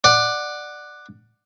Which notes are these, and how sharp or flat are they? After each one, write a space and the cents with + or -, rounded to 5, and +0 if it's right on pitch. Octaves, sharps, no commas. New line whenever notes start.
D5 +15 F#5 +0